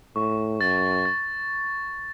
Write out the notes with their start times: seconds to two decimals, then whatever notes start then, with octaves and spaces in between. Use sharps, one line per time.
0.16 A2 C#6
0.61 F#2 A6
1.05 A6